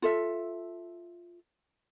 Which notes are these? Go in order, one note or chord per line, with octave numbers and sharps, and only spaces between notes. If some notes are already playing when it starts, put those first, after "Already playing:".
F4 A4 E5